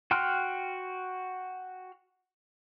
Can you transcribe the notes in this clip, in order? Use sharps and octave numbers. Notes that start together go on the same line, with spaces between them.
F#4 G5 C6 F6 F#6